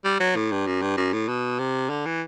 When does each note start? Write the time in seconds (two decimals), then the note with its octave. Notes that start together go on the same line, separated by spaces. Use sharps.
0.05 G3
0.20 F#3
0.36 A2
0.52 G2
0.67 F#2
0.82 G2
0.97 F#2
1.13 A2
1.28 B2
1.59 C3
1.90 D3
2.06 E3